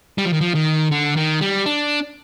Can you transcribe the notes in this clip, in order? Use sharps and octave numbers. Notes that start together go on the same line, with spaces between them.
G3
F3
D#3
F3
D#3
D3
D#3
G3
D4